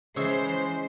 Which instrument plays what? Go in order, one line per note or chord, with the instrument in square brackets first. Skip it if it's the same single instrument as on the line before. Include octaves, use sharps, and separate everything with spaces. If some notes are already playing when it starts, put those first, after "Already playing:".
[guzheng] C#3 C#5 E5 [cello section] E3 C5 [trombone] G#3